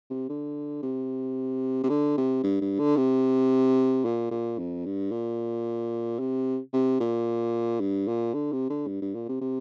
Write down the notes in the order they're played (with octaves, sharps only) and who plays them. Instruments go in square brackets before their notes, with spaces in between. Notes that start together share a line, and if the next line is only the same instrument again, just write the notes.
[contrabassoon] C3
D3
C3
C3
D3
C3
G2
G2
D3
C3
A#2
A#2
F2
G2
A#2
C3
C3
A#2
G2
A#2
D3
C3
D3
G2
G2
A#2
C3
C3